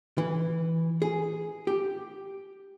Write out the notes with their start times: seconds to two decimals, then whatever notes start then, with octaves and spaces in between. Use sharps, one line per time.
0.18 E3
1.02 G#4
1.67 G4